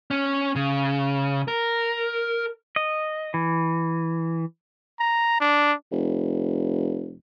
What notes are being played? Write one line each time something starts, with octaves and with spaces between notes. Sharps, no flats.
C#4
C#3
A#4
D#5
E3
A#5
D4
F1